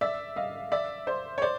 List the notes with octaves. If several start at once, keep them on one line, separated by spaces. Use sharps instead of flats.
D5 E5
D#5 F5
D5 E5
C5 D5
C#5
C5 D5